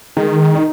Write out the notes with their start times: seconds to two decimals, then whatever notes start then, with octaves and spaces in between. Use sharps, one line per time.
0.17 D#3 G#3
0.55 D#4